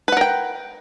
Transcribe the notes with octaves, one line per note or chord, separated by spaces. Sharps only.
A#4 B4 F#5 G5